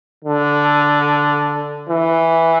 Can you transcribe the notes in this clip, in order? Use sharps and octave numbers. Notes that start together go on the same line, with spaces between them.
D3
E3